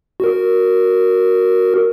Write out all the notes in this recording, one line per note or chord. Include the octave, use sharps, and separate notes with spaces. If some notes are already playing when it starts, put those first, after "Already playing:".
F#4 A#4